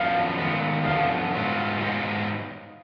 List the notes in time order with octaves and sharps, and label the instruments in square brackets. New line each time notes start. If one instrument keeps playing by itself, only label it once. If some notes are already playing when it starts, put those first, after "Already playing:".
Already playing: [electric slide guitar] F#2 F3 B3 D4 [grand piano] F5
[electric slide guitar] D#3 G#3 B3
[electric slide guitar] F#2 D3 F3 B3 [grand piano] F5
[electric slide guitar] G#2 F#3 B3 F4
G#2 F#3 B3 D#4